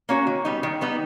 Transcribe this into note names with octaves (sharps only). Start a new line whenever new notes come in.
A#3 C#4 F#4
D#3
G3 B3 D#4
D#3
G3 B3 D#4